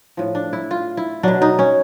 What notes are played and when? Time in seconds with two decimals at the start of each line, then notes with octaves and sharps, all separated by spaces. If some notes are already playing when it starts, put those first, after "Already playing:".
0.17 A2 F3
0.35 D4
0.53 E4
0.71 F4
0.97 E4
1.23 B2 F#3 D4
1.42 D#4
1.59 C#4